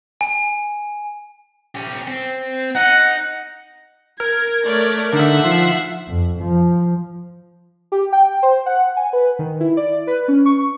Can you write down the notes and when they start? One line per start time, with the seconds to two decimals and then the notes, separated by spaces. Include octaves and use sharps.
0.21 G#5
1.75 C#4 G4
2.07 C4
2.75 D#4 F#5
4.20 A#4 G#6
4.66 A3 C#5 D5
5.13 D3 D#4 E5 F#5
5.44 F3 C7
6.08 F2
6.40 F3
7.92 G4
8.12 G5
8.43 C5
8.66 F#5
8.97 G#5
9.13 B4
9.39 D#3
9.60 E4
9.77 D5
10.07 B4
10.28 C#4
10.46 C#6